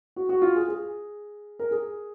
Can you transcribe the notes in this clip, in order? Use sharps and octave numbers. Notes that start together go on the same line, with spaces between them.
F#4
F#4
F4
G#4
G#4
A#4
G#4